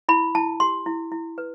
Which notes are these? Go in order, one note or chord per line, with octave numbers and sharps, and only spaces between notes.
E4 B5
E4 A5
G4 C6
E4
E4
B4